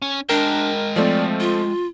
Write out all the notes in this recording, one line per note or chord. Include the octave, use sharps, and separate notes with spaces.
C#4
G#3 D4 A#4 G5
F3 A3 C4 D5
F4